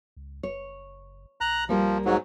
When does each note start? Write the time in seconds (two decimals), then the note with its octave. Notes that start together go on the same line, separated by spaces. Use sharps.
0.17 C#2
0.43 F#1 C#5
1.41 B1 A#5 F#6
1.69 F3 G3 A#3 G4
2.05 G#2 F#3